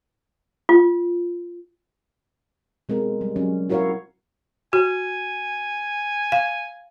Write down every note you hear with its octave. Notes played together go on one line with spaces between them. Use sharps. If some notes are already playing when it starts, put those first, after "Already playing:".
F4
B2 G#3 C4 A#4
G3
F#3 C#4
E4 F#4 A#4 C#5 E5 F5
F#4 G#5
F5